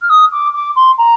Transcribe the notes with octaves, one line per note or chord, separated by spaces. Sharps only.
F6
D#6
D6
D6
C6
A#5